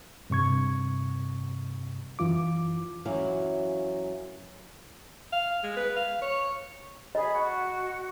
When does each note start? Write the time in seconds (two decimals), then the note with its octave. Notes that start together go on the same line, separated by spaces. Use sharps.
0.30 G2 C3 C#6 G#6
2.19 F#2 E3 F4 D6
3.05 F#2 E3 F#3 E4 F5
5.33 F5
5.63 G#3
5.77 B4
5.97 F5
6.22 C#5
7.15 G#4 D#5 B5
7.32 F#4